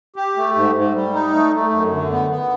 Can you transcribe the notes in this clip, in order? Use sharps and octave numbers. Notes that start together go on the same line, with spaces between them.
G4
A3
G#2
G#2
G3
D#4
A3
A3
F#2
D3
B3
B3